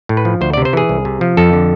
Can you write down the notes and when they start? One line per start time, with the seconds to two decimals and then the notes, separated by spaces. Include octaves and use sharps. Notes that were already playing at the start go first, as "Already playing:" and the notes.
0.09 A2
0.17 B4
0.25 F3
0.41 D2 C5
0.54 D5
0.57 C3
0.65 C5
0.73 E3 G#4
0.89 C2
1.05 C3
1.21 F3
1.37 F2 A4
1.53 D3